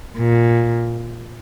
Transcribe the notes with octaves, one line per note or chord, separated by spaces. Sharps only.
A#2